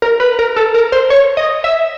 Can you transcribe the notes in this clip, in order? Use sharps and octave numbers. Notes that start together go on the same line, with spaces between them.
A#4
B4
A#4
A4
A#4
C5
C#5
D#5
E5